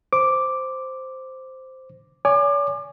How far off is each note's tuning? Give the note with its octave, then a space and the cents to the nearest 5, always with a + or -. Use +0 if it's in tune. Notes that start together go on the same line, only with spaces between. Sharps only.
C5 -5 D6 +0
C#5 +45 G#5 +0 D6 +35